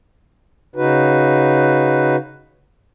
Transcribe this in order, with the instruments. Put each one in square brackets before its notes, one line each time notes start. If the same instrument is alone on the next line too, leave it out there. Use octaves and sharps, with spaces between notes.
[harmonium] C#3 D#4 F#4 B4